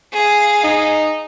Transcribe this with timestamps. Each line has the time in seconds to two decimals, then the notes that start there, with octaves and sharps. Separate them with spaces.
0.13 G#4 F5
0.64 D#4